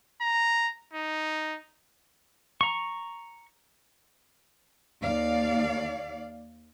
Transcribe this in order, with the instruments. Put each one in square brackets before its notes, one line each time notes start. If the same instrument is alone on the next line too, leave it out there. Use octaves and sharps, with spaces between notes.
[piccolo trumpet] A#5
D#4
[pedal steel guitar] A#5 C#6
[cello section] D#2 D5 F5